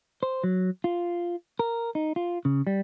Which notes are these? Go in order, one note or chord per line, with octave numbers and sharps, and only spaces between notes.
C5
F#3
F4
A#4
D#4
F4
C#3
G3